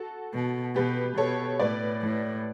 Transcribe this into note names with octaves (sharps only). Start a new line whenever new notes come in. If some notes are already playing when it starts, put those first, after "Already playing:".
Already playing: F#4 A4
B2
B2 G4 B4
B2 A4 C#5
A2 B4 D5
A2